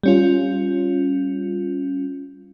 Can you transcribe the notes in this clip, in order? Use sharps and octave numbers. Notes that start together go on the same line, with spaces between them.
G3 C#4 F4